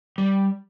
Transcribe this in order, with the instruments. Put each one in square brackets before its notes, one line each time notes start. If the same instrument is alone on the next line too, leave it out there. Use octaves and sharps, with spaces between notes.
[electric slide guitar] G3